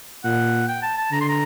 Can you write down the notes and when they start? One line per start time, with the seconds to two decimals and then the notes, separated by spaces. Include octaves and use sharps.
0.24 A#2 F#5
0.68 G5
0.82 A5
0.97 A5
1.11 D3 A#5
1.21 C6
1.29 A#5